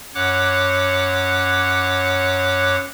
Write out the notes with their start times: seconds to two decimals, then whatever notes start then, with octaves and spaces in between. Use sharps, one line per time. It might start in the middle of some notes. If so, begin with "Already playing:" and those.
0.15 F#2 C#5 F#5 D6 F#6